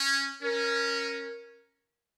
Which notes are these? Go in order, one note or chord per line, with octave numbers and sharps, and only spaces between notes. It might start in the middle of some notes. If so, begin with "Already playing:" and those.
Already playing: C#4
C#4 A#4